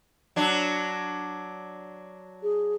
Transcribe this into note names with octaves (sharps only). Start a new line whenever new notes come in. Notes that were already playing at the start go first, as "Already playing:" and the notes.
F#3 D4
G#4